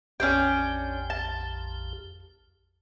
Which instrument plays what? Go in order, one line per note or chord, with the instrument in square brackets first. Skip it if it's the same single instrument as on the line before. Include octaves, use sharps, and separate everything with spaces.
[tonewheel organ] A#1 F2 G4 [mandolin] C#4 D4 G5
[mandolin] A5